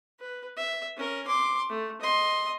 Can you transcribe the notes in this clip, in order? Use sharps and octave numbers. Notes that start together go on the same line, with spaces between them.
B4
E5
C#4 A#4
C6 D6
A3
D#5 C6